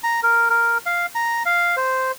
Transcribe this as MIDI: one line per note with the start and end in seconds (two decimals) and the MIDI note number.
0.04 0.20 82
0.23 0.49 70
0.50 0.78 70
0.86 1.06 77
1.15 1.43 82
1.46 1.76 77
1.77 2.12 72